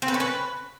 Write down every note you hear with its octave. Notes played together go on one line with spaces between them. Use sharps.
C4
B4
C#4
B4